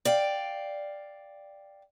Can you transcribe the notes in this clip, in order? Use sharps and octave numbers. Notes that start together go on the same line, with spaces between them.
D5 F5 G5